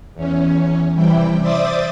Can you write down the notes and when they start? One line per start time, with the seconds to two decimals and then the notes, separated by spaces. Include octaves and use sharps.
0.14 E2 C#4
0.94 C3 E3 G3 E4 G5
1.40 C5 D5 E5 D6 D#6 A6